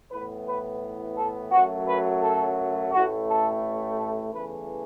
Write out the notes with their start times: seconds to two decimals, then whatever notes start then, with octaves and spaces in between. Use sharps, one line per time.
0.11 A2 E3 B3 B4
0.47 B4
1.17 A4
1.52 F#2 F#3 A3 F#4
1.88 B4
2.23 A4
2.92 A1 A2 A3 F#4
3.27 A4
3.98 A4
4.32 E2 C#3 E3 A3 B4